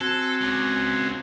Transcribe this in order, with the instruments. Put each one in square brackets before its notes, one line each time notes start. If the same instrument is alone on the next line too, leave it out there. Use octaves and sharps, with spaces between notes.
[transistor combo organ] C4 F#4 G#5 [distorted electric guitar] A4
[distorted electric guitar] C#2